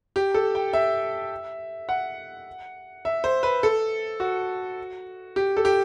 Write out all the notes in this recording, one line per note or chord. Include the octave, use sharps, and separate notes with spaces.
G4
A4
G5
E5
F#5
E5
C5
B4
A4
F#4
G4
A4
G4